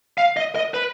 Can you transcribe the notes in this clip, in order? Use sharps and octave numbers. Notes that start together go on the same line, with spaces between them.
F5
D#5
D#5
B4